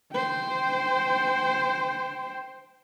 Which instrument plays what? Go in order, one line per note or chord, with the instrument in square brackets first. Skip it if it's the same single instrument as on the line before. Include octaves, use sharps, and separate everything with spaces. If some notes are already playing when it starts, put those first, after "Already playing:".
[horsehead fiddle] C5 G5